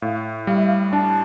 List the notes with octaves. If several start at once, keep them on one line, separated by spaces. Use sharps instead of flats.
A2 F5
G3 F5
E5
F5
D4 A5